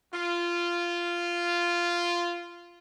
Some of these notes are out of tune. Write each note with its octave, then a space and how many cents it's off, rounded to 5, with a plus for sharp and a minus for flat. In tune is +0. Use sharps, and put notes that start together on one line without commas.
F4 -10